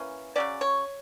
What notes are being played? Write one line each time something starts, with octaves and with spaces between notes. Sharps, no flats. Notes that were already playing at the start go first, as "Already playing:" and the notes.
Already playing: E3 A#3 C#4
C#3 F#3 C#4 D5
C#5